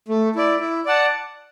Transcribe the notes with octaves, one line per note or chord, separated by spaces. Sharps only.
A3
E4 D5
E4
D5 F#5 A5